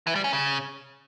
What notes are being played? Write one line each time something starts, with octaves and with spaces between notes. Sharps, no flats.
E3
G3
C#4
C#3